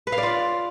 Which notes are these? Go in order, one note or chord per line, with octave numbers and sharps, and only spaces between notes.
B4
F5
D5
F4